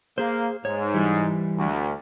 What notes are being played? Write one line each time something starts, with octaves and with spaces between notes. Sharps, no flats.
A#3 G#4 C5
G#2 C#5
E3 G3
D2